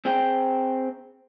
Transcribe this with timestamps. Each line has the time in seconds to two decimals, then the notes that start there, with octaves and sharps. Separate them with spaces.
0.05 C4 G#4 G5